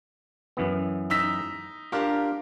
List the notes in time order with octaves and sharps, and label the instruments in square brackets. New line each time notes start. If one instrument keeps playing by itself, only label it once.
[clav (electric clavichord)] F#2 E3 B3
[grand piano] D#4 E6 B6
[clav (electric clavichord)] D4 F4 [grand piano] G4 A#4 F5